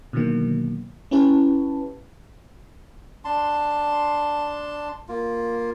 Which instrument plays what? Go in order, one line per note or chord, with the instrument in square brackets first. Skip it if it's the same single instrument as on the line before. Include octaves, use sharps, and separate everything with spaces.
[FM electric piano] B2 D3 D#3 F#3 A#3
C#4 E4 G4 B4 C#5 A5
[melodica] D4 A5 C6
A#3 F4